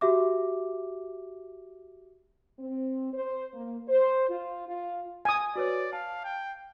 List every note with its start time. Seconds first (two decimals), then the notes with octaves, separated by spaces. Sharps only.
0.01 F#4 G4 E5 D6
2.59 C4
3.13 C5
3.54 A#3
3.89 C5
4.28 F4
4.67 F4
5.25 G#5 D#6
5.56 F#4 B4 C#5 D5
5.93 F5 A5
6.24 G5